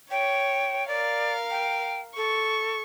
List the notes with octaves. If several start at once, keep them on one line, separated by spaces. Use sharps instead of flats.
C#5 G5
A#4 D5 F5
G5
A4 C#6